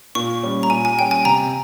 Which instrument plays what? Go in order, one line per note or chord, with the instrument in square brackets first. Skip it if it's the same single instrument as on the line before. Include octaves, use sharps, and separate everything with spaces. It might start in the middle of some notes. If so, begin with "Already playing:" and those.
[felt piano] A#2 [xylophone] C#6
[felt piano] G3 C#4
[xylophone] A#5
[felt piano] A#2 [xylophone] G#5
[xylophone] G#5
[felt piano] G3 C#4 [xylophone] G5
[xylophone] G#5
[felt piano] C3 [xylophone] A#5